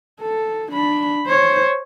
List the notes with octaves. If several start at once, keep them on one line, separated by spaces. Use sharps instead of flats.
A4
D4 B5
C5 C#5